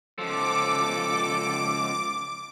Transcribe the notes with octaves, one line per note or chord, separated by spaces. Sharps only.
C#2 F3 A4 D6